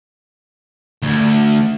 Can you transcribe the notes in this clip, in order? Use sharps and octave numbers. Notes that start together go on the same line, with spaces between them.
D2